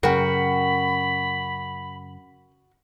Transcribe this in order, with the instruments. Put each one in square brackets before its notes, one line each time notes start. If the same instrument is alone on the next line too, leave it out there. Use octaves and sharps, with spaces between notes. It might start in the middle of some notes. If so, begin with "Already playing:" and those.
[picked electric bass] F#2 C#3 [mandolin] F#4 [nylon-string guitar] A#4 G5 [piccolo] B5